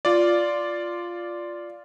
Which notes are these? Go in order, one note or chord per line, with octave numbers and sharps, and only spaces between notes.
F4 D5